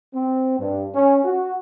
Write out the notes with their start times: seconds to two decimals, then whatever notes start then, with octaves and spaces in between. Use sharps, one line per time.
0.13 C4
0.59 G2
0.95 C#4
1.25 F#4